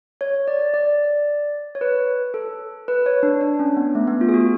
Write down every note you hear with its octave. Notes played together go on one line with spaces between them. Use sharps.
C#5
D5
D5
C#5
B4
A4
B4
C#5
D4
D4
C#4
B3
A3
B3
F4
G#4
F#4